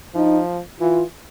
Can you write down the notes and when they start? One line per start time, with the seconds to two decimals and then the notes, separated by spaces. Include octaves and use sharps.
0.15 F3 D#4
0.80 E3 F4